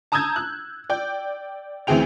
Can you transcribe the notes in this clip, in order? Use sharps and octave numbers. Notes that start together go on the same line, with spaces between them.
A5 A#5 D#6 E6 G6 G#6
F#6
D5 G5 G6
D2 E3 C4 G#4 G5 F7